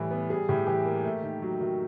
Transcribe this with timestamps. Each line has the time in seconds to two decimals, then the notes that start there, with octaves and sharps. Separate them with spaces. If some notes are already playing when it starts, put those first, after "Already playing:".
Already playing: A2 E3 G3
0.11 B3
0.30 G3 G#4
0.49 A2 G4
0.67 E3 G4
0.85 A#3
1.05 A3
1.22 D#3
1.42 F#3 F#4
1.60 D#3 F#4